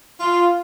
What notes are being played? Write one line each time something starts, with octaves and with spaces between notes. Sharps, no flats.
F4